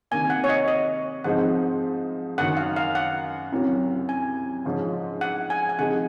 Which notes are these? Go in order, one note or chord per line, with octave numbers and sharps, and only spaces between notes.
C3 D#3 A#3 G#5
F#5
C#5
D#5
D#5
G#2 F3 G#3 C4 D#4 F#5
F#2 D#3 F#3 F#5
F5
F5
F#5
C2 C3 F#3 C#4
G#5
G#2 F3 G#3 C#4 F4
F#5
G#5
G#5
C3 F3 G#3 D#4 G#4 F#5